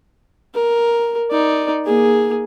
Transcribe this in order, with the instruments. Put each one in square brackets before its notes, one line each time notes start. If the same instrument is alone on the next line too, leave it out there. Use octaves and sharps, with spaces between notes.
[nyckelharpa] A#4
D#4 D5
A#3 G#4